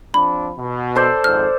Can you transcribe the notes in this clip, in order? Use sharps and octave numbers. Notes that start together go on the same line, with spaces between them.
F3 C4 D4 B5
B2
A4 C5 D5
G#1 F2 G#2 F6